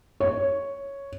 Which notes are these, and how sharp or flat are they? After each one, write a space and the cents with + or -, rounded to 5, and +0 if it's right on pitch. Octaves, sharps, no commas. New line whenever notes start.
C#5 +0